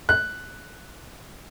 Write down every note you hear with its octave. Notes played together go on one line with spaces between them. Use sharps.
F#6